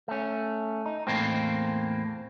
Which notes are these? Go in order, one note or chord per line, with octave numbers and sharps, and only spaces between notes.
A3 C#4
D#4
E2 A2 A#3 C4